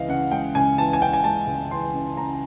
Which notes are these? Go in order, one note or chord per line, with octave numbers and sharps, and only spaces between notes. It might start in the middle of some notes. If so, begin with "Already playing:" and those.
Already playing: C#2 E3 G#3 D#5 F5
C#3 F#5
G#3 G5
C#2 G#5
E3 A5
G#5
C#3 G5
G#5
G#3 A5
C#2
E3 C6
C#3
G#3 A#5